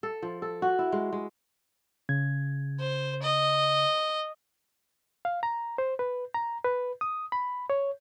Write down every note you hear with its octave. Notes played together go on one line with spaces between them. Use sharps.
A4
F3
A4
F#4
E4
G#3
G#3
C#3 G#6
C5
D#5
F5
A#5
C5
B4
A#5
B4
D#6
B5
C#5